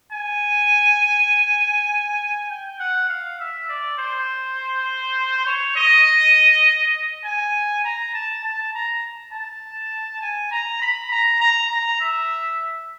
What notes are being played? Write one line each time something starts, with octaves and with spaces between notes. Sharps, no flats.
G#5
G5
F#5
F5
E5
D5
C5
C#5
D#5
G#5
A#5
A5
A5
A#5
A5
G#5
A#5
B5
A#5
A#5
A#5
E5